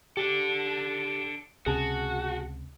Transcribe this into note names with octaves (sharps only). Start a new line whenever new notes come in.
D4 G4 A4
C#2 C3 C#4 F#4 G#4 A5